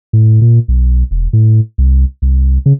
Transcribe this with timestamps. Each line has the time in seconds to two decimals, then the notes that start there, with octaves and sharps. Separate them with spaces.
0.13 A2
0.41 A#2
0.68 B1
1.11 E1
1.33 A2
1.78 C2
2.22 C2
2.66 C#3